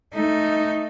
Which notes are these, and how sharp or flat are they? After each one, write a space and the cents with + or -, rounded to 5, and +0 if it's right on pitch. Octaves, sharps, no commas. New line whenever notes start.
A3 +0 D#4 +0